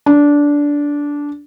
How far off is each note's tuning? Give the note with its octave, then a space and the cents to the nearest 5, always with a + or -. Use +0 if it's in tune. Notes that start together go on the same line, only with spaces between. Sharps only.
D4 -15